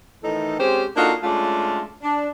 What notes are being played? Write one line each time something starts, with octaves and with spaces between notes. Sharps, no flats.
A2 D#3 E3 D#4 A4
G#3 C4 C#4 G4 G#4 C5
A#3 D4 D#4 F4 F#4 A4
G#3 A3 C#4 D4 F4
D4